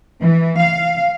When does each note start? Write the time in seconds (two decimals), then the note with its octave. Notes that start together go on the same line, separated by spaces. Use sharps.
0.23 E3
0.59 F5